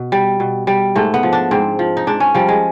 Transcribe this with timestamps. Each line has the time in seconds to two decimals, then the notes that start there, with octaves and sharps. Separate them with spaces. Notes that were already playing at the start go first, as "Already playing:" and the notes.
Already playing: B2
0.12 G3
0.40 B2
0.67 G3
0.96 G#2 A3
1.14 B3
1.23 F3
1.33 D4
1.51 G#2 C4
1.79 F3
1.97 D#4
2.07 G#2 D4
2.20 C#4
2.34 F3 G3
2.48 G#3